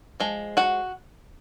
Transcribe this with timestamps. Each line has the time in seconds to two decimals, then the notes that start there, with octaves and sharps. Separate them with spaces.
0.20 F3 G#3
0.57 F#4 F#5